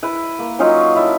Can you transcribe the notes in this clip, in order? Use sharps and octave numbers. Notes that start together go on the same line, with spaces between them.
E4 B4
A#3
F#3 C#4 D#4 F4
E4 E5 A5